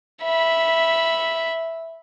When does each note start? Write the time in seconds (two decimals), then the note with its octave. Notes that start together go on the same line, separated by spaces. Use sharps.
0.23 E5 B5